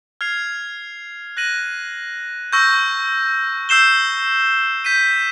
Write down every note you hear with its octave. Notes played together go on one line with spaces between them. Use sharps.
F6 G#6 C7 F7
F#6 A#6 D#7 F#7
C#6 E6 G6 A#6
E6 G6 C7 E7 G7
G6 B6 D#7